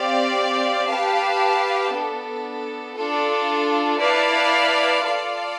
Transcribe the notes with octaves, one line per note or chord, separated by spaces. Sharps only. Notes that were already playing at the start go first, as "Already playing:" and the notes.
Already playing: C4 G4 D5 F5
G4 B4 F5 A5
B3 D4 A4
D4 F4 A4
E4 B4 D5 F5 A5
F4 A4 D5 F5